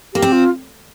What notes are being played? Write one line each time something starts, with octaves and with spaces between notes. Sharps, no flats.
A#3 G4
C4
F4